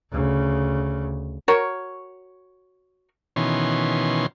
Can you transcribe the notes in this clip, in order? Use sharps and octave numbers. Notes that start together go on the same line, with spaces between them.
D2 C#3
F#4 A#4 C#5
B2 D#3 E3 C#4 C6